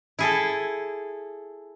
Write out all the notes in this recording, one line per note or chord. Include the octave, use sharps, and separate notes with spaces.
E4 G#4 A4